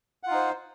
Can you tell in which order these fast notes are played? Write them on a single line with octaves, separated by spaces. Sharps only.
F#5 F4 D#4 C5